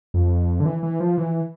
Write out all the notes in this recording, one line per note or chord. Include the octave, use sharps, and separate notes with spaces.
F2
D3
E3
E3
F3
E3